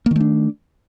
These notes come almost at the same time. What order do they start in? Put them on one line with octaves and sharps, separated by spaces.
A#3 D#3 A3 D4